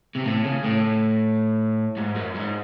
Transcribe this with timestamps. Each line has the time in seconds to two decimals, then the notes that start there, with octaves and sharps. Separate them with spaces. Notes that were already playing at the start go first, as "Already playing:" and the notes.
0.15 C3
0.25 A2
0.44 C#3
0.64 A2
1.97 G#2
2.16 F#2
2.35 G#2